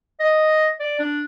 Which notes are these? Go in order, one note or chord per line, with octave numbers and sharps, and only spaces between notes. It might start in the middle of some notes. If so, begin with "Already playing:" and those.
D#5
D5
D4